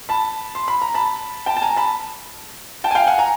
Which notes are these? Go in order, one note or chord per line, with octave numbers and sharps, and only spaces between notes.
A5 B5
C6
B5
A#5
A5 B5
G5 A5
A5
G#5 A#5
A5 B5
G5 A5
G#5
F5 G5
F#5 G#5
G#5 A#5